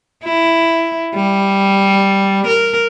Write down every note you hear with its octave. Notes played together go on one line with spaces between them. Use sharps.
E4
G3
A#4